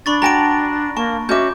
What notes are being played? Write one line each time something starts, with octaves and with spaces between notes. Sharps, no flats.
D4 B5 C#6 A6
F#4 G5 A5 A#5 A#6 D7
A#3 A5 C#6
C#4 F#4 D#5 E5 D6 G6